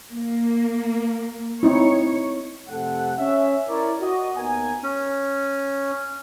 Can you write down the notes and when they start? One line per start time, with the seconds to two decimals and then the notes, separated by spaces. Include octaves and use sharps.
0.11 A#3
1.63 C4 D#4 E4 C#5
2.69 F2 C3 A3 A4 F#5
3.18 C#4 E5
3.68 E4 A#4 C#5 D5
4.00 F#4 D#5
4.36 D#2 D#3 B3 A#4 G#5
4.83 C#4